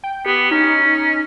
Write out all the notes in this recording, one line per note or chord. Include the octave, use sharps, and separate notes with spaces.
G5
B3 G4
C#4 D#4